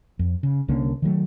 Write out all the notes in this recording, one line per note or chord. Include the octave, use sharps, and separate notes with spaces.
F2
C#3
C2 D3 A#3 C#4
D#3 F#3 G#3 A3